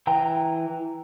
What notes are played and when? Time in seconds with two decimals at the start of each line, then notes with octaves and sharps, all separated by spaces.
0.07 E3 G5 A#5